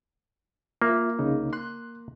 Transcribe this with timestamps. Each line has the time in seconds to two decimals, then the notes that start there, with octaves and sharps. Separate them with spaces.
0.82 A#3 F4 E5
1.19 C2 C#3 D#4
1.53 C6 F#6